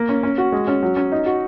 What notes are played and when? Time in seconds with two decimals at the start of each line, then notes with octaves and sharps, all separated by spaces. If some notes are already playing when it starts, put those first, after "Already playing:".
Already playing: A#3
0.09 C#4
0.23 C#4
0.38 F#4
0.52 G#3
0.67 C#4
0.83 F#3
0.96 C#4
1.12 D#4
1.26 F#4